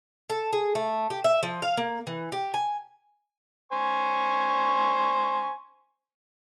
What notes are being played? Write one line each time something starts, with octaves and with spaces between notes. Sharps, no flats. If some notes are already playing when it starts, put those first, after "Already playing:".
A4
G#4
A3
G4
E5
F3
F5
A#3
E3
G4
G#5
C5 G#5 C#6